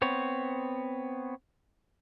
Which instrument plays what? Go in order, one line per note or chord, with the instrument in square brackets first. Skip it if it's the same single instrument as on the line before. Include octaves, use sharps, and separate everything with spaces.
[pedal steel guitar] B3 C4 C#5